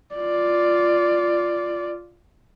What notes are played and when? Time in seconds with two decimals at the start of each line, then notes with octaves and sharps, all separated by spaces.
0.15 F4 D5